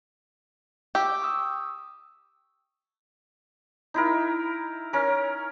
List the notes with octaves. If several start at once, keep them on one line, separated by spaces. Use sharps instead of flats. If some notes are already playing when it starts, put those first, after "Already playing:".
G4 D6 E6
C#6 D#6 E6
D#4 E4 A#4
C#4 A#4